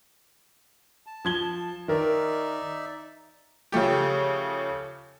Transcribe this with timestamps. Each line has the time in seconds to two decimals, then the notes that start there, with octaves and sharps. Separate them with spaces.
1.07 A5
1.25 F3 G#6 G7
1.88 D#3 D#4 A#4 D5 E5
3.72 C#3 F3 A3 G4